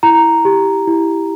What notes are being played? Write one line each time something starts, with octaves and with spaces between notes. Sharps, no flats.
E4 A#5
G4
E4